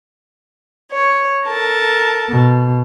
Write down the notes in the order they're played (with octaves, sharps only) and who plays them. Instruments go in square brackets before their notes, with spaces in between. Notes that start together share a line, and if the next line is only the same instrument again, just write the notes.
[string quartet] C#5
A4 A#4 A5
[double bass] B2